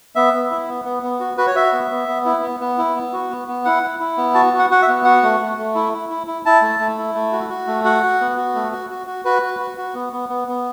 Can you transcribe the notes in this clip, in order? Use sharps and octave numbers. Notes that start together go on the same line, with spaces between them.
B3 E5
B3
E4
B3
B3
B3
F#4
F#4 B4
C#5
F#4 E5
B3
B3
B3
E4
B3
B3
E4
B3
F#4
B3
B3
E4 F#5
E4
E4
B3
F#4 A5
F#4
F#5
F#4 F#5
E5
B3
F#4 F#5
A3
A3
A3
E4
E4
E4
E4
E4 A5
A3
A3
E4
A3
F#4
F#4
A3
F#4 F#5
F#4
B3
F#4
A3
F#4
F#4
F#4
F#4 B4
F#4
F#4
F#4
B3
B3
B3
B3